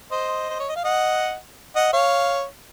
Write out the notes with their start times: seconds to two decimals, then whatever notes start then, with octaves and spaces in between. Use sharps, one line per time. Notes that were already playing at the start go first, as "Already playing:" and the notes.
0.12 C5 D#5
0.50 C5
0.60 C#5
0.68 D#5
0.76 F5
0.84 D#5 F#5
1.76 D#5 F#5
1.93 C#5 F5